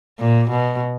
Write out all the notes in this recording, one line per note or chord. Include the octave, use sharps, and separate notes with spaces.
A#2
B2